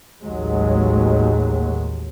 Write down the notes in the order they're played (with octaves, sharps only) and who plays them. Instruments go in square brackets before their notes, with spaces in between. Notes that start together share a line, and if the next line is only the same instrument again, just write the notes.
[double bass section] A1 D#2 F#3 G#3